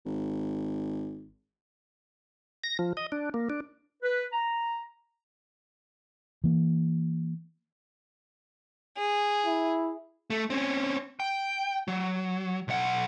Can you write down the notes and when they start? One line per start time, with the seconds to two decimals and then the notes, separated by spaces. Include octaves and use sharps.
0.06 G#1
2.64 A#6
2.79 F3
2.97 D#5
3.12 D4
3.34 A#3
3.50 D4
4.03 B4
4.33 A#5
6.44 E3 A#3
8.97 G#4
9.46 E4
10.30 A3
10.50 C4 C#4
11.20 G5
11.88 F#3
12.68 B1 F#5